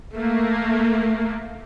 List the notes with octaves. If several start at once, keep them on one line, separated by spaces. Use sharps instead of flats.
A3 A#3